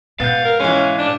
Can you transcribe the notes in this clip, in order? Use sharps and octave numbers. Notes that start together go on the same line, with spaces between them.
G#2 B2 B3 F5 G6 A6
A#4
E3 G#3 C#4
D4